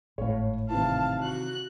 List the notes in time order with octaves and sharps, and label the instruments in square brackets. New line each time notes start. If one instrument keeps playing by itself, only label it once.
[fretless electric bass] G#1 A2 [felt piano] C#5 F5
[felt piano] C3 D#3 E3 [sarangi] F5 [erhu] A5
[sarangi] F#4 [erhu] F#6